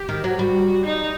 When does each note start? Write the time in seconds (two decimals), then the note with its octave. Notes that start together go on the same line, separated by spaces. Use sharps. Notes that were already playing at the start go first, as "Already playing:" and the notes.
Already playing: G4
0.09 D#3
0.24 F#3
0.39 G3 F#4
0.85 D#4